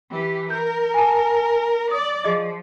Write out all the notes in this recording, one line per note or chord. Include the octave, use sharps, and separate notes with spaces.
E3 G4
A#4 G6
G#5 A5
D5 D#6
F3 G#4 D#5